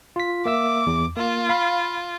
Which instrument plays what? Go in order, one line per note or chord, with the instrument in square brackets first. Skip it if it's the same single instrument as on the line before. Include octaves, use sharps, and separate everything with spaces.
[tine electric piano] F4 B6
[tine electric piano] A#3 E5 E6 [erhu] D6
[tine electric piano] E2
[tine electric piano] A#3 [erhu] F4
[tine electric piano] F5 B5